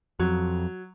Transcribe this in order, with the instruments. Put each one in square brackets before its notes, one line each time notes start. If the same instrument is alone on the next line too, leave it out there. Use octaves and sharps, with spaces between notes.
[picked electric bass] F2 [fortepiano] F#3